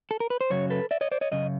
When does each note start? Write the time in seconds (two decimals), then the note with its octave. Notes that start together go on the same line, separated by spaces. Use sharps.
0.11 A4
0.20 A#4
0.30 B4
0.41 C5
0.50 F#2 C#3 F#3 C#5
0.70 A4 B4
0.91 D5 E5
1.01 C#5 D#5
1.12 C5 D5
1.21 C#5 D#5
1.32 F#2 C#3 D#5